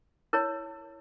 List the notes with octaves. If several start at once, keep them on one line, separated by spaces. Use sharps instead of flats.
E4 A#4 C#5